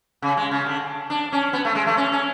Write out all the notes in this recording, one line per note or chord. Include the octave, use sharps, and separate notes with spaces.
C#3
G#3
C#3
D3
D4
C#4
B3
A3
G#3
A3
C#4
C#4